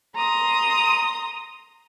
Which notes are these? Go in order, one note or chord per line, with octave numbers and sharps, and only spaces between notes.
A#5 C6 D#6